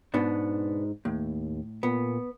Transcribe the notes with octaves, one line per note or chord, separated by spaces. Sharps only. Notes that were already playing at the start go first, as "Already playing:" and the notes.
G#2 B2 B3 D4
D#2 A2
A#2 B3